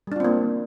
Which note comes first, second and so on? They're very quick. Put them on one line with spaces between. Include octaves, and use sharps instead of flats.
G3 D4 F4 C4 A#3